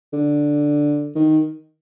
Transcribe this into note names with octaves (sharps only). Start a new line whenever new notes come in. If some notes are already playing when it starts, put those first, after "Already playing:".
D3
D#3